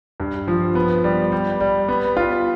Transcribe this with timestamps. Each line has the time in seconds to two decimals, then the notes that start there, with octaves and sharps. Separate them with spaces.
0.20 G2
0.48 F3
0.75 B3
1.04 G3
1.32 G3
1.60 G3
1.88 B3
2.17 F4